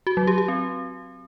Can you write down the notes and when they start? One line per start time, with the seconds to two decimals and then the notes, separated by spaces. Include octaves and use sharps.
0.07 F#4
0.17 F#3
0.27 G4
0.38 G4
0.48 C4